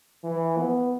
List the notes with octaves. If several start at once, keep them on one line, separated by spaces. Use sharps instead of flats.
E3
B3